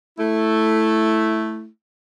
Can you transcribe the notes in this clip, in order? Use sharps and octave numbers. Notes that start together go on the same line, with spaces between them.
A3 E4